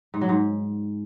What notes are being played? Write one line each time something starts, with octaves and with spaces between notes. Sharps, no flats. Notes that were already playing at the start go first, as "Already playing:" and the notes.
G#2
F#3
G#2